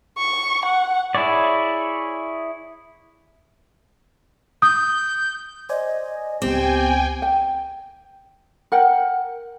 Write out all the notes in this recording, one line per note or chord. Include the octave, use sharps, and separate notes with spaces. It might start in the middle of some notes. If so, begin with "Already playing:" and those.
C#6
F#5
E4 G#4 C#5 D5
D#6 G6
C5 D5 D#5 G#5
C#2 B3 C4 G4 G5 G#5 D6
G5
A#4 F#5 G5